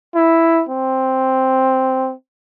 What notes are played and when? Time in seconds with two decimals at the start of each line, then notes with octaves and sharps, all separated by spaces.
0.15 E4
0.69 C4